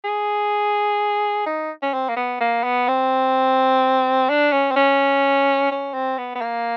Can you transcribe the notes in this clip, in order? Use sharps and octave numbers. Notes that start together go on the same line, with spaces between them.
G#4
D#4
C#4
C4
A#3
B3
A#3
B3
C4
D4
C#4
C4
C#4
C#4
C4
B3
B3
A#3